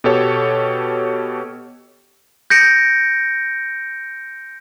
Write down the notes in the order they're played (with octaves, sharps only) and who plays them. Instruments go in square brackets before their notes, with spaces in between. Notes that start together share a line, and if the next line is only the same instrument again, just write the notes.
[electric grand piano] B2 G4 A4 C#5
[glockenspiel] G6 A#6 C#7 D7